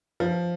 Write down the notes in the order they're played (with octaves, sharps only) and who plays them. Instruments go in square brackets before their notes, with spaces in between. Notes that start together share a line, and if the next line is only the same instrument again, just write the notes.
[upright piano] F3